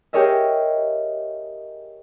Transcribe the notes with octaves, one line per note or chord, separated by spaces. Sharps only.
G4 G#4 A#4 C#5 D#5 E5